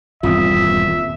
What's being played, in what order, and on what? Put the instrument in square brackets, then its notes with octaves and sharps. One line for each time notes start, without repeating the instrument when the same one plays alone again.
[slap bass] D#1 E2 C4 [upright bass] G2 [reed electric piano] F4 D#6 [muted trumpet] E5